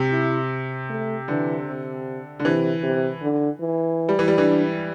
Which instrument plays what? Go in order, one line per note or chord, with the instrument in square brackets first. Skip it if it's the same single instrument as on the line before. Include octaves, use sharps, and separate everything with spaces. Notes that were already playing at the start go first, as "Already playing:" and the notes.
Already playing: [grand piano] C3
[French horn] E4
A3
[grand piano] D3 [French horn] E3
[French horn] C3
[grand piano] D3
[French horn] C3 [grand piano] E3
[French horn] C3
D3
E3
[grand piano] G3
E3
G3
[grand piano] E3 [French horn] D4